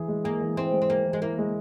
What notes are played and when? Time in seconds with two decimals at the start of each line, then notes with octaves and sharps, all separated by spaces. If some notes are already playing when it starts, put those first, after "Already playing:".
Already playing: E3 E4 G#4
0.08 G#3
0.24 A#3 G#4
0.41 E3
0.57 C4 E4
0.73 G#3
0.82 C4
0.89 A#3 G#4
1.06 E3
1.13 G#3
1.22 A#3 E4
1.38 G#3